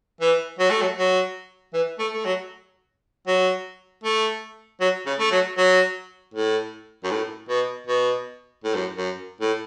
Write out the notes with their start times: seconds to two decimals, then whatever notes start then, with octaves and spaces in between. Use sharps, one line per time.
0.21 E3
0.59 F#3
0.70 A3
0.81 F#3
0.97 F#3
1.73 E3
1.99 A3
2.13 A3
2.25 F#3
3.27 F#3
4.04 A3
4.81 F#3
5.06 C#3
5.19 A3
5.32 F#3
5.57 F#3
6.34 A2
7.04 F#2
7.11 A2
7.49 B2
7.87 B2
8.64 A2
8.75 F#2
8.96 F#2
9.41 A2